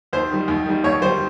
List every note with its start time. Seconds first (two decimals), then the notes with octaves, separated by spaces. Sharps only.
0.13 D#2 C5
0.31 D#3 G3
0.48 D#2
0.66 D#3 G3
0.84 D#2 C#5
1.02 D#3 G3 C5